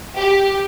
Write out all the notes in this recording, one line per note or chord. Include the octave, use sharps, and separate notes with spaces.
G4